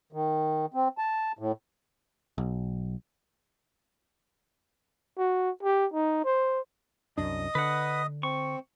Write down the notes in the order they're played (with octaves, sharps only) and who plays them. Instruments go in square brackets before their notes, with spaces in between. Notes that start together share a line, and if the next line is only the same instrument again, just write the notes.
[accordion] D#3
C4
A5
A2
[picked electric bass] B1
[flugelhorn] F#4
G4
D#4
C5
[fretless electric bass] C2 F#2 D4 [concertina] D#5 D#6
[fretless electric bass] D3 [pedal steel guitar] B4 F#5
[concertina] C4 [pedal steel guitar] C#6